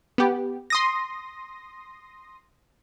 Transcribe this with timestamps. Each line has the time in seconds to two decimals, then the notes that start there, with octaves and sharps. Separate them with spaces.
0.18 B3 G4
0.70 C6 D#6 A#6